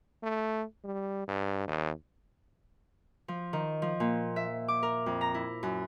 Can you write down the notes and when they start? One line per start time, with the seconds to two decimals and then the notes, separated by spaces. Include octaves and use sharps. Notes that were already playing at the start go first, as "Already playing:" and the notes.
0.23 A3
0.84 G3
1.28 G2
1.67 D#2
3.28 F3
3.53 D#3
3.82 F3
4.00 A#2
4.36 E5
4.68 D6
4.83 A#4
5.06 F2
5.21 A#5
5.34 E4
5.63 F#2